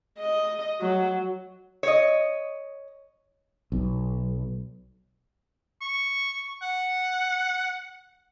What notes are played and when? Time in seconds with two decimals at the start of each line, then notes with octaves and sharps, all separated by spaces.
0.19 D#5
0.81 F#3
1.83 C#5 D#5
3.72 B1
5.81 C#6
6.62 F#5